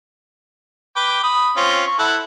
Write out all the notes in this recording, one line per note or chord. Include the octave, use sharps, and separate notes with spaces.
B4 G5 D6
B5 D#6
C4 C#4 F4
C#6
E4 A4 F#5